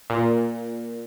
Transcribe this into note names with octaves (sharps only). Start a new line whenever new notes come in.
A#2